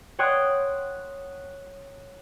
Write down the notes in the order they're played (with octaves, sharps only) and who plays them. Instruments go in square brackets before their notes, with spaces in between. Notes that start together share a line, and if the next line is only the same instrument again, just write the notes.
[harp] C#5 F#5 G5 C6 D#6 F#6